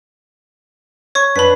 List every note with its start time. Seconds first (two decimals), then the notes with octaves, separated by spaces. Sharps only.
1.15 C#5 C#6
1.36 F2 D4 B4 B5 B6